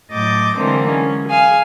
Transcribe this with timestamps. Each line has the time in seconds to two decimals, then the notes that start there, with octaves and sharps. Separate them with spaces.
0.12 A2 F#3 D#5 D6 G6 A6
0.57 D3 E3 F#3 G#3 A#3 C4
0.90 C#4
1.28 G#4 F5 G#5